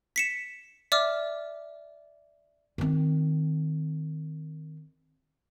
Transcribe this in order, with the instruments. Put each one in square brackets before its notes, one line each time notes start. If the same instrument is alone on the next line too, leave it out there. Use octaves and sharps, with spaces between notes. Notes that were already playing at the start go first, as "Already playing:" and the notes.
[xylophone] B6 C#7 E7
D5 E5 D6 F6
[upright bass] D#3 C4